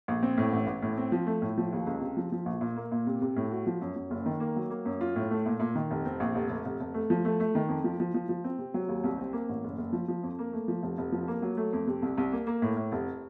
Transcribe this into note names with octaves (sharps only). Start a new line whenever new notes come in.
A#1
C4
A2
A1
A1
A2
C4
F3
A3
A2
F3
D#2
C#2
C3
F3
F3
A#1
A#2
A#3
A#2
C3
C3
A2
F#4
F3
F#2
F#2
F#1
D#3
A#3
F#3
A#3
F#2
F4
A2
A3
A#2
A#2
D#3
F1
C4
A#1
F1
F1
F1
F1
A3
F3
A3
A3
D#3
F2
F3
F3
F3
F3
C4
C3
F#3
D#2
C2
C4
A#3
A1
F#1
F#1
F3
F3
F2
A#3
A3
F3
F1
F1
F3
A#3
F#3
A3
F2
C3
C2
C2
A#3
A#3
A2
A2
F1